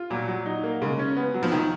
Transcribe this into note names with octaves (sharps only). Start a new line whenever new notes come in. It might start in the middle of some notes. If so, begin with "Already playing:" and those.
Already playing: F4
A#2 F#3
F#3
D#4
A#3
C#3 G#3
C#4
B3
F#3
F3
D#3